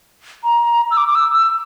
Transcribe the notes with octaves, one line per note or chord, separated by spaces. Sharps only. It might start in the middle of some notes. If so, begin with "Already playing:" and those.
A#5
E6
D6
D6
E6
E6